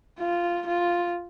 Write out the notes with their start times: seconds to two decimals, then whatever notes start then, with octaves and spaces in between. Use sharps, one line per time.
0.20 F4
0.67 F4